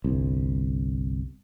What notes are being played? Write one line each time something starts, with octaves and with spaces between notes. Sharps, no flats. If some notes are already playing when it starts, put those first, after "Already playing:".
G1 C2